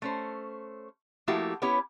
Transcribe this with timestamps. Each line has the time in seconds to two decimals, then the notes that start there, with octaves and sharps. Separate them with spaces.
0.02 A3 C#4 C5
1.27 F3 A3 A#3 E4 F#4 G4
1.62 B3 C#4 E4 G4 C#5